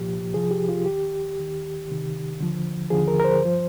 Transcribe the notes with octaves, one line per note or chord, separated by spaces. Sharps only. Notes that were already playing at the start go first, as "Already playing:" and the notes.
Already playing: C2 A#2 F3 G4
C2 C3 F3 G#4
G4
F4
D#2 D#3 G4
D#2 D#3
D2 C3 D#3
D#2 D3 F3
D#2 D3 F3 G#4
A#4
A#4
C5
G2 F3